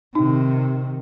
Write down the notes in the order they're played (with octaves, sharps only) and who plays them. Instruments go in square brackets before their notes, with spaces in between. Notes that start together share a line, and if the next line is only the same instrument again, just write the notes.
[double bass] C3 D#3 [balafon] D#4